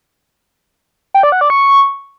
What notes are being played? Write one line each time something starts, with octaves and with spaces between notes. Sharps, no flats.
G5
D5
F#5
D5
C#6